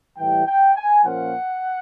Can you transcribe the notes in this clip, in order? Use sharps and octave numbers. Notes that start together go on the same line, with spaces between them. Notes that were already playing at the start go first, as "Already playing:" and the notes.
A2 E3 G3 G5
G5
G#5
A#2 F3 A#3 C#4 F4 F#5